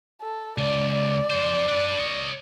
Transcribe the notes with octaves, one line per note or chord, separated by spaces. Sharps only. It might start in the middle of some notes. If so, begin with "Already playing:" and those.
A4
C#2 D5
D5
F2 C5
D4 B4
C#5 D#5